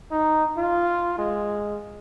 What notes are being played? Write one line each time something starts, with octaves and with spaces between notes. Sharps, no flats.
D#4
F4
G#3